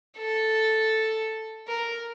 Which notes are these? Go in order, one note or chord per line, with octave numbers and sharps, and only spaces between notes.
A4
A#4